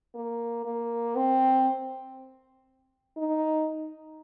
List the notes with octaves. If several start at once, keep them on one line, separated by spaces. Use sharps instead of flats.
A#3
A#3
C4
D#4